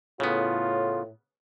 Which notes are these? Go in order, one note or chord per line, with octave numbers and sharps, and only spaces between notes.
A2 C#3 B3 F4